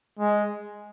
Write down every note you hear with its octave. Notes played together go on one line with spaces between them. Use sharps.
G#3